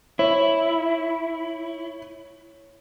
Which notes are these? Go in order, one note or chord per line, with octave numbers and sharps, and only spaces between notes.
E4 C#5